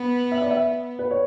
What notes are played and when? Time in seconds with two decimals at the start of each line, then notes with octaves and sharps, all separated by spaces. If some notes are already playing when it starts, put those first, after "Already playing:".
Already playing: B3
0.32 E5
0.42 D5
0.51 E5
0.99 B4
1.11 C#5